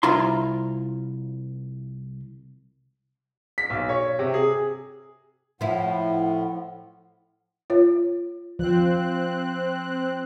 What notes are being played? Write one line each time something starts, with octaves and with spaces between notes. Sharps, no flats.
C2 E4 F4 A#5 C6
B6
B1
C#5
C3
G#4
A2 F3 E4 F#5
F4 C#5
F3 C4 F#6